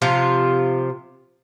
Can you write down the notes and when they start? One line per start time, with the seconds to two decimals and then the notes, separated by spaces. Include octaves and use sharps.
0.02 C3 F3 F4